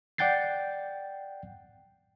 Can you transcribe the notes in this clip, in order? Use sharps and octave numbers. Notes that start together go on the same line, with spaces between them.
D5 F#5 G5 G6 A6 C7